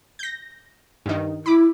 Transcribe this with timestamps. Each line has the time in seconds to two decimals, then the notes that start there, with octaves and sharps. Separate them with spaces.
0.19 G6 A#6
1.06 G2 D#3
1.46 E4 B5 D6